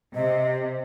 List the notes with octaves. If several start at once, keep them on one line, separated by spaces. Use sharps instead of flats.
C3 D#5